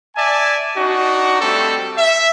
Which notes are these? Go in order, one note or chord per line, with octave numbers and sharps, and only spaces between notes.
D5 E5 G#5 A5
D4 D#4 F#4
G3 A3 C4 A4
E5